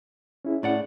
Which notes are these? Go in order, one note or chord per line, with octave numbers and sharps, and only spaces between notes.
C#4 E4 G#4
A2 D5 F#5